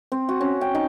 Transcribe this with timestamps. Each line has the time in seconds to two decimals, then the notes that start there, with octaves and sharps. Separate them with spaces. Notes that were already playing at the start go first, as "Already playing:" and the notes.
0.12 C4
0.29 F#4
0.41 C#4
0.61 G5
0.75 D#4